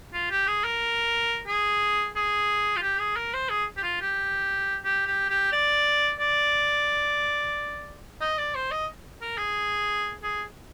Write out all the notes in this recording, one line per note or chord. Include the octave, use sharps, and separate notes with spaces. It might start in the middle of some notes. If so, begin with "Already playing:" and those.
F4
G4
G#4
A#4
G#4
G#4
F4
G4
G#4
A#4
C5
G#4
G4
F4
G4
G4
G4
G4
D5
D5
D#5
D5
C5
D#5
A#4
G#4
G#4